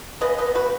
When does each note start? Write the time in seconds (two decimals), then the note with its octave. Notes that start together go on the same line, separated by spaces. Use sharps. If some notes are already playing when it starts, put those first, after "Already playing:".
0.21 C#3 B4 D#5
0.38 B4 D#5
0.46 B3
0.55 F#4 B4